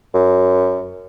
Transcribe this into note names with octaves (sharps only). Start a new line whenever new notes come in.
F#2